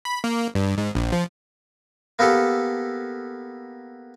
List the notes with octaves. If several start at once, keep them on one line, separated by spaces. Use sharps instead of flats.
B5
A#3
G2
G#2
A#1
F3
A#3 B3 G4 A4